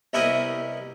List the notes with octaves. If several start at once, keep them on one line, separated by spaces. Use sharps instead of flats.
C2 B2 E4 G4 A#4 D#6